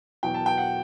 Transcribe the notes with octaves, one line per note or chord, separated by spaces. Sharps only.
E2 B2 F#3 G5
A5
G5
F#5